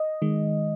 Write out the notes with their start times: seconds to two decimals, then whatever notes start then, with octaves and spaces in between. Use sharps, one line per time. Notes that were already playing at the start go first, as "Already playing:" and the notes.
Already playing: D#5
0.22 D#3 G#3